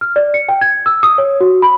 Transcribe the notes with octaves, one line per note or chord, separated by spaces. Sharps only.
F6
D5
C#7
G5
G#6
E6
D#6
C#5
F#4
B5